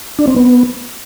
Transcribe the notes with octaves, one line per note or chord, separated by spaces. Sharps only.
D4
C4
B3